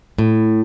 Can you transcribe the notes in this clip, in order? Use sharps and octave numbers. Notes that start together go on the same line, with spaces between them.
A2